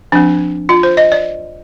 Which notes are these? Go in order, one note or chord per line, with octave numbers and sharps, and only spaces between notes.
F3 C4 D4
F4
C5
D#5
D5